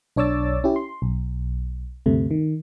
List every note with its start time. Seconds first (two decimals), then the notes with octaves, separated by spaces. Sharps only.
0.16 B1 D4 C#5 D6 E6 A6
0.64 C#4 E4 G4
0.76 C6
1.02 B1
2.06 D2 G2 C3 A3
2.31 D#3